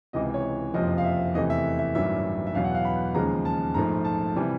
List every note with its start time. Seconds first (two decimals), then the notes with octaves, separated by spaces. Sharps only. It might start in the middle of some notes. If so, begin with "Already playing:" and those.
0.13 C#2 C3 E3 D#5
0.34 C#5
0.74 F#1 F2 C3 F3 D#5
0.98 F5
1.04 E5
1.34 E2 C3 E3 A3 D#5
1.50 E5
1.79 E5
1.95 A1 G2 D#3 F#3 E5
2.47 E5
2.54 E2 B2 F#3 B3 F5
2.64 F#5
2.75 F5
2.85 B5
3.14 D#2 C#3 F3 G#3 A#5
3.45 A5
3.74 A#1 G#2 F3 A3 A#5
4.05 A5
4.36 C3 E3 G3